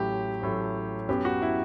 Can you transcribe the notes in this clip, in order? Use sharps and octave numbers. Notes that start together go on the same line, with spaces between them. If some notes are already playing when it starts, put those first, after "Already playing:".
Already playing: A1 A2 F#3 A3 G4
A1 A2 F#3 A3
F#2 F#3 B3 G4
F#4
E4